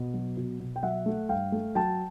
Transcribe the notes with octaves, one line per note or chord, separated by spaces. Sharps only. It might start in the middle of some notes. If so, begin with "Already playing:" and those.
Already playing: B2
F#3
B2
B2
G5
F#3 E5 F#5
A3
G2 F5 G5
A3
F#3 G5 A5